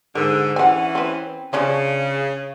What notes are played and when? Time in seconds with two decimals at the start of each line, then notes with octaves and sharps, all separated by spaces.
0.15 G#2 D3 A#4
0.56 E3 C#4 F#5 G#5
0.95 C4 B4
1.53 C#3 F3 C#4 D4